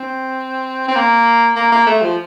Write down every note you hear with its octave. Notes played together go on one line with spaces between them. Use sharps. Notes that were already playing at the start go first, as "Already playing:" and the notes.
Already playing: C4
C4
A#3
A#3
A#3
A3
F3